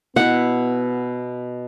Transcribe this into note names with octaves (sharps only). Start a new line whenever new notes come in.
B2 B3 E4 F#5